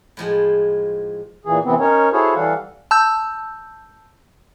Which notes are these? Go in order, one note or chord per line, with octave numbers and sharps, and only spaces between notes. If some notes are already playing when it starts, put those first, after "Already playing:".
A2 F3 G#3
A#2 E3 G#4
F#2 C3 E3 B3 C4
C#4 D#4 A#4 C#5
E4 F#4 G#4 A4 C5 C#5
E3 G3 A4 F5 F#5
A5 E6 G6